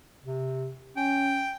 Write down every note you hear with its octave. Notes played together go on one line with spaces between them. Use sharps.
C3
C#4 G5